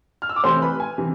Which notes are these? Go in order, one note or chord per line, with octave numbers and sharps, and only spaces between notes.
F6
E6
D6
C3 E3 A3 C5 C6
B4 B5
G#5
C3 E3